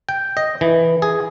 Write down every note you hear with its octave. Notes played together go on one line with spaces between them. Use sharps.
G5
D#5
E3
G#4